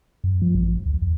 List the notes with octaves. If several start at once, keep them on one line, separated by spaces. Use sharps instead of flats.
F#2
F3
A1
D2
F2